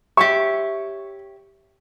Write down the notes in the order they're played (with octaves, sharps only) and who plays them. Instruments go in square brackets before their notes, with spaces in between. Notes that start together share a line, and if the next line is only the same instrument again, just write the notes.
[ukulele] G4 C#5 E5 [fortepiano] C#6